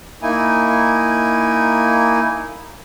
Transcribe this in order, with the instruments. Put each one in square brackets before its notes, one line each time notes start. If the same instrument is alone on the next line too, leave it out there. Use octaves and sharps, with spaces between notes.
[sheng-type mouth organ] A#3 D#4 E4 G#5